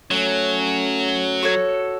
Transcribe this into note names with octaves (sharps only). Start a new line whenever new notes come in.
F#3 A3 C#4
F#4 A4 C#5